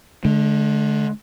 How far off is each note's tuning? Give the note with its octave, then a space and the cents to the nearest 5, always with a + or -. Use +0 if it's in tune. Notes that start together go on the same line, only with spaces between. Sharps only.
D3 +0 G#3 +45